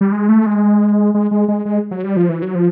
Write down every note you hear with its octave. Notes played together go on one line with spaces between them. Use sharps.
G3
G#3
A3
G#3
G#3
G#3
G#3
G#3
F#3
G3
F3
E3
F#3
F3